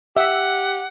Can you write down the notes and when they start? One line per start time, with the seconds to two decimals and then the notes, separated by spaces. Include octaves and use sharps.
0.17 G4 E5 F#5